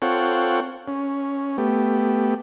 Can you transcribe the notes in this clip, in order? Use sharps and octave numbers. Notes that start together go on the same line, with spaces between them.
C4 F4 A4 C#5 F#5 G5
C#4
A3 B3 G4